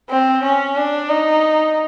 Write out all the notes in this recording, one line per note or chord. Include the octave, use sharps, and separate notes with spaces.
C4
C#4
D4
D#4